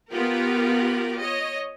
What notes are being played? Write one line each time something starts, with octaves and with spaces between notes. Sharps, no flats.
B3 F4 G4 A#4
C#5 D#5